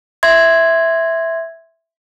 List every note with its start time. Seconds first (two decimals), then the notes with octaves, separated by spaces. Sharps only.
0.23 E5 C6 G#6